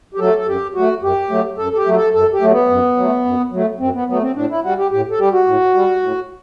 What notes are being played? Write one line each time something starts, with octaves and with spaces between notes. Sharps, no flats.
G4
F#3 A3 A4
A4
F#2 G4
F#3 A3 F#4
F#2 G4
F#3 A3
F#2 A4
A4
G4
F#3 A3
A4
F#2 A4
G4
F#3 A3
B3
F#2
F#3 A3
F#2
F#3 A3
F#2 C4
B3
F#3 A3 B3
C4
A2 D4
E4
G3 F#4
G4
A2 G4
A4
G3 G4
F#4
A2
G3
A2